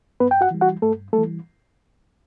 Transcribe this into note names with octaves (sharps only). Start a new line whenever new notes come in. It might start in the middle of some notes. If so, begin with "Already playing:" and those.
G2 B3 B4
G5
F#4 F#5
E3 G3
F#4 F#5
G2 A3 A4
G3 A3 A4
E3